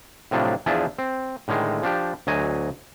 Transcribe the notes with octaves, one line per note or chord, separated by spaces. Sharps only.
A2 C3 F3 F#3 D4
E2 F3 D4 G#4 D5 E5
C4
A2 D3 D#3 G#3
F3 D4 G4
D2 F#3 D#5 G#5